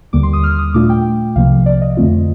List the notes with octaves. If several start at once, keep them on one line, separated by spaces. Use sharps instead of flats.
D#2 D3 G3 A#3 D6
C6
D#6
F6
D#6
A#2 A3 D4 F4 D6
G5
C2 C3 F3 A#3 F5
D5
D#5
F2 D3 A3 C4 F4